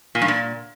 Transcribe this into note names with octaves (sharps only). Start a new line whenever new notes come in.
A#2
G2
A#2